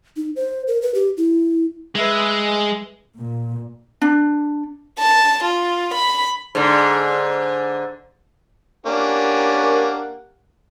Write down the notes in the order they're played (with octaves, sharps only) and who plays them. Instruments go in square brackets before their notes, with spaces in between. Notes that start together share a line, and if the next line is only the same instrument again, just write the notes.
[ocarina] D#4
C5
A#4
B4
G4
E4
[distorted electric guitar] G#3 [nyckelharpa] B4 E5
[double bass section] A#2
[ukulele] D4
[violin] A5
F4
B5
[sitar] G#2 D3
[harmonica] A#3 C#4 D4 [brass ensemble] G4 A#4 F#5